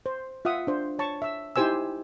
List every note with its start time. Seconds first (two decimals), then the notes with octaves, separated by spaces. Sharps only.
0.06 C5
0.45 F4 E5 F#5 D#6
0.67 D4 C5
0.99 C#5 A5 C#6
1.22 E5 E6
1.56 D#4 E4 G4 C5 G#5 E6